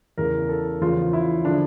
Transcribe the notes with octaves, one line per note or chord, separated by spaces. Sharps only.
E2 C#3 E3 A#4
A4
E2 C#3 F3 F4
E4
D3 F3 D4